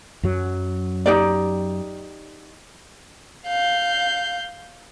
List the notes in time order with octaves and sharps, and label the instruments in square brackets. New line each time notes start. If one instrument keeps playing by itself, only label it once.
[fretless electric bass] F#2 F#3
[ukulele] D#4 G4 D5
[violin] F5 G6